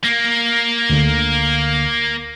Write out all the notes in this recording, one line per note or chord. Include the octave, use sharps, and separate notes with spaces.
A#3
D2 D3